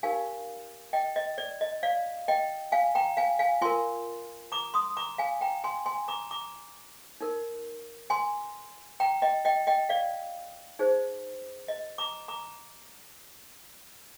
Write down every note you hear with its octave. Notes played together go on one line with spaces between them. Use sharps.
D#4 G4 A#4 F5 G#5
D#5 G5
D#5
D5
D#5
D5 F5
D#5 G5
F5 G#5
G5 A#5
F5 G#5
F5 G#5
F4 A#4 G#5 C6
A#5 D6
C6 D#6
A#5 D6
F5 G#5
G5 A#5
G#5 C6
G#5 C6
A#5 D6
A#5 D6
D#4 A#4
G#5 C6
G5 A#5
D#5 G5
D#5 G5
D#5 G5
D5 F5
D#4 G#4 C5
D#5
A#5 D6
A#5 D6